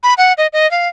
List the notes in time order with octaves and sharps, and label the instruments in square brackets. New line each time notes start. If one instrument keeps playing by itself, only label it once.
[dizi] B5
F#5
D#5
D#5
F5